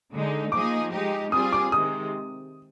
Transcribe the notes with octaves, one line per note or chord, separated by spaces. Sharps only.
D3 G#3 D#4
F3 A#3 D#4 G#4 D6
G#3 D#4 G4
G3 C4 F4 G#4 D#6
D6
C3 D#3 G#3 D#6